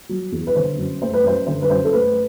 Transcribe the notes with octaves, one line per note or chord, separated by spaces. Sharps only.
F#3
E2
B4
D3 C5
F#2
A3 C5
B4
F#2 C5
D3 C5
B4
F#2 C5
A4
A3 B4